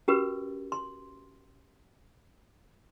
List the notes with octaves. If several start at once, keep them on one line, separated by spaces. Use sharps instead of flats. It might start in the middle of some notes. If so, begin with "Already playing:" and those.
C#4 F#4 G4 A#4 B4
C6